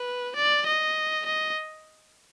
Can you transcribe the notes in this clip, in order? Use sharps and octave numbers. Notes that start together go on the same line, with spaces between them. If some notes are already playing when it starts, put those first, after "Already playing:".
Already playing: B4
D5
D#5
D#5